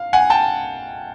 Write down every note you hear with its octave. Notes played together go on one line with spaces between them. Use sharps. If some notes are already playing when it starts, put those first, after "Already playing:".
Already playing: F5
F#5 G#5
G5 A5